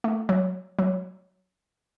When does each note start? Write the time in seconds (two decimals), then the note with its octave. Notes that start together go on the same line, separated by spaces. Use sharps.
0.04 A3
0.29 F#3
0.79 F#3